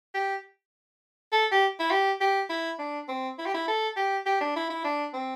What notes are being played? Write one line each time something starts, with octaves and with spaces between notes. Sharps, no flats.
G4
A4
G4
E4
G4
G4
E4
D4
C4
E4
G4
E4
A4
G4
G4
D4
E4
E4
D4
C4